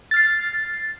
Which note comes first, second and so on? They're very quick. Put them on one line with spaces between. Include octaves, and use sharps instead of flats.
A6 F6 C7